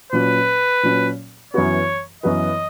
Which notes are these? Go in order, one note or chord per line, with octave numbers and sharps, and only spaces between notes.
A#2 F#3 C#4 B4
A#2 F#3 C#4
F#2 E3 B3 F#4 B4 C#5
F#2 E3 B3 F#4 B4 D#5